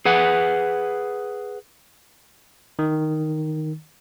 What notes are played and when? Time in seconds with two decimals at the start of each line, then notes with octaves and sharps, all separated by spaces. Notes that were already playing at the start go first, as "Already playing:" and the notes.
0.05 G#4 B4 F#5
2.79 D#3